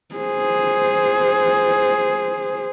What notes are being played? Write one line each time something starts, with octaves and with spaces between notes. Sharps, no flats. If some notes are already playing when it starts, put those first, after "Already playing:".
G#4 C5